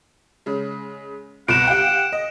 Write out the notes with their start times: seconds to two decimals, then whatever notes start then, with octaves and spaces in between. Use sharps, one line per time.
0.46 C#3 G#3
1.48 C2 B2 F#5 D7 E7
1.67 G4 F5 G5
2.13 D#5